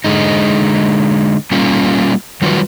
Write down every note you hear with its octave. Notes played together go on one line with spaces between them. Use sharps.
D3 G#3 D#4
G3 A#3 C#4 F4
D#3 F#3 G3 F4 F#4 B4